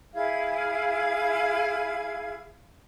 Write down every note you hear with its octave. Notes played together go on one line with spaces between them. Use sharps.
E4 G#4 F5 G#6